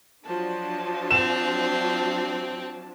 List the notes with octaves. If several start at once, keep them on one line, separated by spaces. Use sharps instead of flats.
F3 F#3 D4 A5
C4 E7